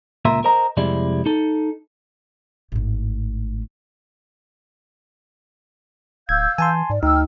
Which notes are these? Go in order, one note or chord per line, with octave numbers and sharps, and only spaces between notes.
C#2 A#2 A#4 E5 C6
A#4 C5 D#5 A#5
C2 F2 C3 G#3 E4 D5
D#4 A4
G#1 A2
D1 F5 E6 G6 G#6
E3 G#5 A5 C6
G#2 D5
D2 D#4 G5 E6 F6